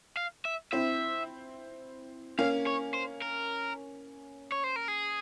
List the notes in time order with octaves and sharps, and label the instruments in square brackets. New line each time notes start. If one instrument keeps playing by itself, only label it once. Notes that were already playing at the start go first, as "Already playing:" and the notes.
[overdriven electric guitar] F5
E5
[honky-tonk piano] C4 E4 [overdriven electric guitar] E5
[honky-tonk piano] A#3 C#4 [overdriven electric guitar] F5
[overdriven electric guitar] C#5
C5
A#4
C#5
C5
A#4
G#4